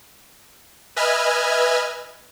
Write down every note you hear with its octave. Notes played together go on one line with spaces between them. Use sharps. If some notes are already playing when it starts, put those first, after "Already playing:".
B4 D#5 E5 G#5 F6 G#6